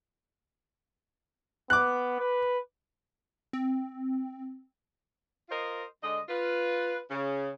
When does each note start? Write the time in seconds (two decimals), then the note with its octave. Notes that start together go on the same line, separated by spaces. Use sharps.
1.70 B3 D6 F#6
2.20 B4
3.53 C4
5.49 F4 A#4 C5 D#5
6.03 D3 G#3 D#5
6.29 F4 B4
7.10 C#3